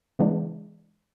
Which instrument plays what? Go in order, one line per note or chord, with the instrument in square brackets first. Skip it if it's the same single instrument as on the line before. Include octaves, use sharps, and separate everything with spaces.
[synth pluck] C#3 E3 G#3 B3 D4